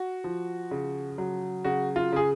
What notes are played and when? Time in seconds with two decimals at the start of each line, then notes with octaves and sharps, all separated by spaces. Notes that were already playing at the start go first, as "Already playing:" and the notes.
Already playing: F#4
0.24 F3
0.71 C#3
1.18 F#3
1.64 C#3 F#4
1.96 F4
2.13 C#3 G#4